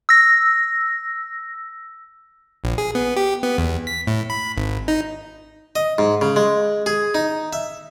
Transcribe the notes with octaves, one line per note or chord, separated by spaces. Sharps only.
E6 A#6
A#1
G#4
B3
G4
B3
E2
B6
A2
B5
G#1
D#4
D#5
G#2
C#3
G#3
G#4
D#4
E5